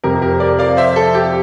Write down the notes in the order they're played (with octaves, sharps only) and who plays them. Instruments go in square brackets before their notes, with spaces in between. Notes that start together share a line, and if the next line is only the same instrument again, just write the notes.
[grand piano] F2 C3 G3 G4 A#4
G4 A#4
A#4 D5
D5 F5
C5 E5
A4
G4